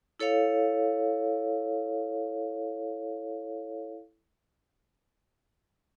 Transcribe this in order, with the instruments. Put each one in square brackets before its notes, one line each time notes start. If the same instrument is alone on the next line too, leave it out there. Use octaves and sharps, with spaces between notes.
[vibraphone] E4 A4 C#5 F5